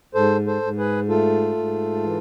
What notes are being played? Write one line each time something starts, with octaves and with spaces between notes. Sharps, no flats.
G#2 A4 C5
A4 C5
G#2
G#4 B4
A3 F4 A4
G#2
E3